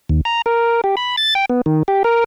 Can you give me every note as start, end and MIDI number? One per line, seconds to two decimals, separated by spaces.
0.09 0.21 39
0.25 0.42 82
0.46 0.81 70
0.84 0.95 67
0.97 1.16 83
1.17 1.34 93
1.35 1.45 79
1.50 1.61 59
1.66 1.83 51
1.88 2.03 67
2.04 2.24 70